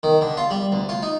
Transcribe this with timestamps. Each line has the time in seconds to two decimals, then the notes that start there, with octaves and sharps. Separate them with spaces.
0.03 D#3
0.21 D3
0.37 F4
0.50 G3
0.72 D2
0.89 F4
1.03 D#4